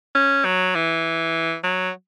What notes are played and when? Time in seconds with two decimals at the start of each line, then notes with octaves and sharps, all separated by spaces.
0.15 C#4
0.45 F#3
0.75 E3
1.64 F#3